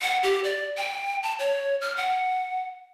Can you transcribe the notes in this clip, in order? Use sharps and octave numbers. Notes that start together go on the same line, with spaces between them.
F#5
G4
D5
G5
A5
C#5
F6
F#5